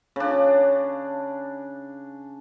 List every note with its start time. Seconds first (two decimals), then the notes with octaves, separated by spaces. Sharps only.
0.16 C#3 D4